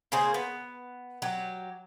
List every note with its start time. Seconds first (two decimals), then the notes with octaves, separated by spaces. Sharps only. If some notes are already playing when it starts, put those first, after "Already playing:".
0.12 C#3 A#3 G#4 C5
0.34 B3
1.22 F#3 G4